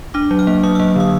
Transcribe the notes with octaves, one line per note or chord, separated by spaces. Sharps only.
D4 D6
F#3
F6
A#3
F#3 D#6
E6
A#3
D3 D#6